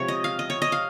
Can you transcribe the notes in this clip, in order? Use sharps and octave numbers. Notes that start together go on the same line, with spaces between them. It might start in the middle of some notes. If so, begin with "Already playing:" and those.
Already playing: C3 F3 G#3 C#5
D#5
F5
D#5
C#5
D#5
F5